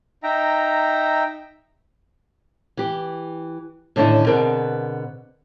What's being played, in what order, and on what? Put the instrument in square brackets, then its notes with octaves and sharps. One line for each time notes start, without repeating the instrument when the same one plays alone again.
[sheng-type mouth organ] D#4 E5 G5 A#5
[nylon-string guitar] E3 G4
A2 D3 D#3 C#4 D4 E4
B2 D3 B3 C4 G#4 A#4